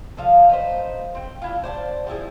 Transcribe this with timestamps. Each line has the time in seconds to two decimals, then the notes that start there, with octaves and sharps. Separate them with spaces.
0.17 D3 F3 F5
0.49 D#4 B4 C5
1.15 C4 G5
1.42 D4 E4 F4
1.63 C5 D5 F#5 A5
2.07 F3 G3 E4 G#4